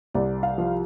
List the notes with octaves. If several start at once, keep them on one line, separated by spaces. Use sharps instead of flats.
C2 D5
F5
F3